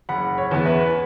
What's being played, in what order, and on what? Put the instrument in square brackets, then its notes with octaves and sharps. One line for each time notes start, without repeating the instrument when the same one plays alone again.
[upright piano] F#1 [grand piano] F#5 B5
[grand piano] C#5
[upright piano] E2 E3 B3
[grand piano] B4 E5